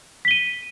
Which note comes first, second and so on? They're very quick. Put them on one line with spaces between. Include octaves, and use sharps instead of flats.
B6 G7 D#7